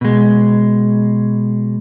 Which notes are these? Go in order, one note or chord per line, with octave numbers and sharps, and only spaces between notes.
B2 G#3